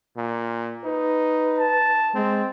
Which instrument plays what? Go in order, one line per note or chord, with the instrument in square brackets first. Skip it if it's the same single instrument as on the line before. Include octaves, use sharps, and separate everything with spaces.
[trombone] A#2
[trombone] D#4 [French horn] B4
[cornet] A5
[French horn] G#3 [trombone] C4